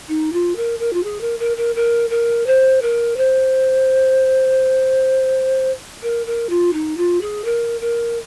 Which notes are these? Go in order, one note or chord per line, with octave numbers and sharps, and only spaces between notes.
D#4
F4
A#4
A#4
F4
G#4
A#4
A#4
A#4
A#4
A#4
C5
A#4
C5
A#4
A#4
F4
D#4
F4
G#4
A#4
A#4